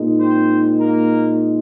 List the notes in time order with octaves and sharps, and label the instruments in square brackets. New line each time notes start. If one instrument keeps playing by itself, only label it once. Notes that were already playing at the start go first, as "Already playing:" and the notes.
Already playing: [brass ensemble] A#2 G#3 D#4
C4 C5
A#3 A#4